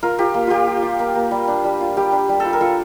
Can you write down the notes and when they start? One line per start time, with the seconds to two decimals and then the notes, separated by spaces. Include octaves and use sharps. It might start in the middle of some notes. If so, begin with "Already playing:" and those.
0.03 F4 A#4
0.19 F4 G4
0.34 A#3
0.47 A#3 F4 G4
0.67 F4
0.83 F4
0.99 A#3
1.15 A#3
1.31 G3
1.48 D4
1.65 G3
1.80 F4
1.97 G3 G4
2.12 D4
2.29 G3
2.40 A4
2.45 F4
2.53 A#4
2.61 F4 A4